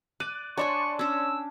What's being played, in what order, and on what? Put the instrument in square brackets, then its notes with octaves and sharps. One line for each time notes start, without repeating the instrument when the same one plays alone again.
[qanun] D5 [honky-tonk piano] F#6 D#7
[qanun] D4 E5 G#5 [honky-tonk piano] C#5 D5 C6 [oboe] C#6
[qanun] C#4 D4 [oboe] E6